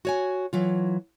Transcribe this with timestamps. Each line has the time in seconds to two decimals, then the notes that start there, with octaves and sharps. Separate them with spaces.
0.05 F#4 C#5 G#5
0.53 E3 F#3 F4